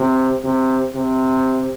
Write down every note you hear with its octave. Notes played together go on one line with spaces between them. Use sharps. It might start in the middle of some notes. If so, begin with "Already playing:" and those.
Already playing: C3
C3
C3